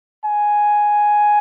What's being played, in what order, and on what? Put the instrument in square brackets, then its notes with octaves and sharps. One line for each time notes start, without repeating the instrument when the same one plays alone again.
[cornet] G#5